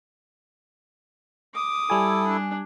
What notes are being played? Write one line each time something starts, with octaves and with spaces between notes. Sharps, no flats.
D6 D#6
G3 E4 A4 G#5
D4